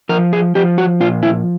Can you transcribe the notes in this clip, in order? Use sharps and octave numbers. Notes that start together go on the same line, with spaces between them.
F3 A#4
G#4
F3 G4
F#4
A#2 F4
E4